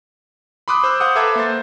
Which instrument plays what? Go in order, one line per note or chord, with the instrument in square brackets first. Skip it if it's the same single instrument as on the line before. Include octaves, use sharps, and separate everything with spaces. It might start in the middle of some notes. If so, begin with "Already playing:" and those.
[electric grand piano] B5 C6 D6 D#6 F#6
C5 D6 E6
C5 F5 F#5 D#6
A4 B4 E5 A#5 D6 G#6
A#3 C5 A6